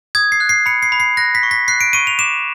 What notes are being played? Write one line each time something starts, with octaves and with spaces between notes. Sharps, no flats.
D#6 G#6
C7
F#6
C7
B5 C#7
C7
B5
C7
F#6 A#6
B6
C#6
B6
F#6 C7
D7
C#6 D#7
F7
D6 E7